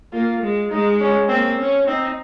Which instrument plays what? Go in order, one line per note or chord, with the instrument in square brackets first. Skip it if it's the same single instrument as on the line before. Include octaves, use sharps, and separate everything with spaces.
[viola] A#3 [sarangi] F4
[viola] G#3
[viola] G#3 [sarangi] D#4
[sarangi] C#4
[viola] A#3 [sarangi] C4
[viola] C#4
[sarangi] C4 [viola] D#4